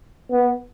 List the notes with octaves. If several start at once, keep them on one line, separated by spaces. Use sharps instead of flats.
B3